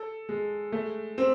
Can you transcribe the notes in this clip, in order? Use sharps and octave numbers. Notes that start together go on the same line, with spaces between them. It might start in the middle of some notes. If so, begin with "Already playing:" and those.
Already playing: A4
G#3
A3
C4